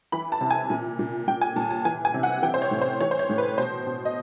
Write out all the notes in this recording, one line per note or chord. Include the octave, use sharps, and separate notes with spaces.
E3 B5
A5
C3
G#5
A#2
A#2
A#2 G5
G#5
A#2 A5
A5
E3 G#5
G#5
C3
F#5
E3 G5
C5
C#5
A2
C5
E3 C#5
C5
C#5
A2
B4
B2 C5
B2
D#5